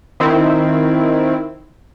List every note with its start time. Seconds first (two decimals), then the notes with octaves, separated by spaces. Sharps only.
0.20 D#3 C4 E4